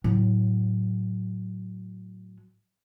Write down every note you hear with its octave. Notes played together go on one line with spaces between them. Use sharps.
A2 F#3